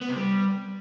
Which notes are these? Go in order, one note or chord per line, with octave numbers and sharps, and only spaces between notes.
B3
C3
G3